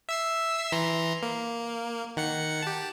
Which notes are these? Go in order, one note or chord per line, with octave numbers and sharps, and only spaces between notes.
E5 E6 C7
E3 A#5 C6
A#3
D#3 F#5 C#7
G4 A5